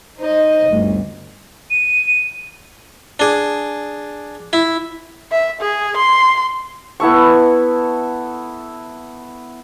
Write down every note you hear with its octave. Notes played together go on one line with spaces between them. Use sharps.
D#4 C5 D#5
G1 D2
D#7
D4 G#4
E4
E5
G#4
C6
B3 E4 A4 C#6